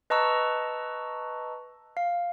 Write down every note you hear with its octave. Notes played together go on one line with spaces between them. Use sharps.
B4 D#5 A5 A#5 C#6 E6
F5